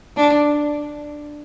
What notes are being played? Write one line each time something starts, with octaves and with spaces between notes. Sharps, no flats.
D4